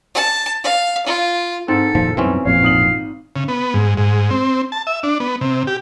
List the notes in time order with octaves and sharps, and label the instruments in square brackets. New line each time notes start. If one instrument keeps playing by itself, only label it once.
[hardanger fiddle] A5
F5
F4
[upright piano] G#2 [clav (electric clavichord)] C4 [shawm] A4
[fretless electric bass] F1 A#2 D#3 [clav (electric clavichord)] F3
[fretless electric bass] C2 F#2 B2 [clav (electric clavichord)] E3 C4 C#4
[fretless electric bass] A1 F2 A#2 [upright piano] C#5 [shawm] F5
[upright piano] G#1 D#6 F#7
[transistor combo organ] C#3
B3
G#2
G#2
C4
A5
E5
D4
B3
C3
G4